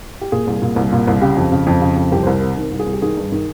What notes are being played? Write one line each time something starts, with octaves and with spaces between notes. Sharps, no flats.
G4
A#2 G#4
C2
A#2
C2
A#2
C2
C#3 G4
F2
C#3
F2
C#3
F2
C2 G4
C2 C5
A#4
C3
D#3 A#4
C2
G#4
C2
G4
D#3 G#4
G2
D#3